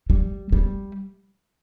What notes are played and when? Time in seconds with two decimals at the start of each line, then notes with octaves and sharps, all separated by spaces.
0.10 G3
0.52 G3